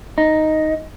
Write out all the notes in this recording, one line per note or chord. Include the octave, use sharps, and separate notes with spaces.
D#4